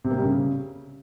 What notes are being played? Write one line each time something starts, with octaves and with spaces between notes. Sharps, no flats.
C3
A#3
G3
C#3